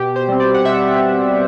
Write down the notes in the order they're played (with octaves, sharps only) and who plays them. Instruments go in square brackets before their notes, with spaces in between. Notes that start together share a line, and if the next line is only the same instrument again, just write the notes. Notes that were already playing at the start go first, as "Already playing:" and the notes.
Already playing: [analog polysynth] B2 G4
C5
G3 C4
D5
F#5
B2 E5